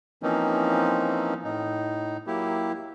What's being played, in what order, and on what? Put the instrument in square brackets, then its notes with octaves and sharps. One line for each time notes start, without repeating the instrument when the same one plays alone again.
[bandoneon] E3 F3 A#3 C4 C#4 D#4
A2 D#4
F#3 A#3 E4 G4